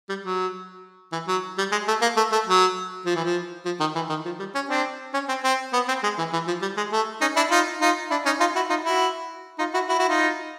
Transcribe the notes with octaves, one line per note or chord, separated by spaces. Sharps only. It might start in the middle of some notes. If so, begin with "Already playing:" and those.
G3
F#3
E3
F#3
G3
G#3
A3
A#3
A3
A3
F#3
F3
E3
F3
F3
D#3
E3
D#3
F3
G3
C#4
C4 D4
C#4
C4
C4
B3
C4
G#3
E3
E3
F3
G3
G#3
A3
C#4 D#4
D4 E4
D#4 F4
D#4 F4
D4 E4
C#4 D#4
D#4 F4
E4 F#4
D#4 F4
E4 F#4
D#4 F4
E4 F#4
E4 F#4
E4 F#4
D#4 F4